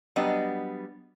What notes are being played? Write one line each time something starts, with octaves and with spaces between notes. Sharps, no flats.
F#3 G3 B3 D4 D#5